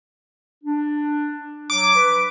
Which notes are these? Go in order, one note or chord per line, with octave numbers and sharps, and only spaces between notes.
D4
F#3 D6
B4